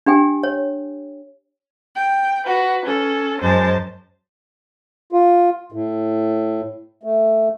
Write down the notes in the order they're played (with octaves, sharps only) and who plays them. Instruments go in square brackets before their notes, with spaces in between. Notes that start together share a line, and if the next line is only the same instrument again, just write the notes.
[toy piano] D4 G4 G5 G#5
C#5
[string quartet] G5
F#4 B4
C#4 A4
F#2 G#3 C5 A5 A6
[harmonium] F4
A2
A3